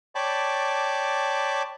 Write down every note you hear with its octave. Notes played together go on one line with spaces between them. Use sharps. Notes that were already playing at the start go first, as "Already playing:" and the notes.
C#5 D5 G5 A5 B5 D6